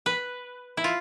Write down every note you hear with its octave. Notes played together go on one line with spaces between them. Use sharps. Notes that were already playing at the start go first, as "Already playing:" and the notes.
B4
E4
F4